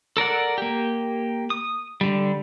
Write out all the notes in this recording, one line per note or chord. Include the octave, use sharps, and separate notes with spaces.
A4 A#4 D5 F#5
A#3 G4
D#6
D3 G3